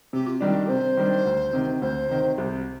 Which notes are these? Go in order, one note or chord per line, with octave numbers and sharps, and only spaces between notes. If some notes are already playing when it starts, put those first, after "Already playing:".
C3 G4
F4
D#3 G3 D4 F4
G4
C3 C5
D#3 G3 D4
D2
C3 D#3
D2 C5
C3 D#3
C2